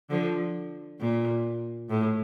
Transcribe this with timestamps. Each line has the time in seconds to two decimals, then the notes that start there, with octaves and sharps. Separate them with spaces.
0.10 D3 F3
1.00 A#2
1.90 A2